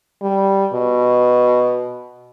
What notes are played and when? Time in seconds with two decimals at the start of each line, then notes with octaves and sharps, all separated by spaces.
0.22 G3
0.73 B2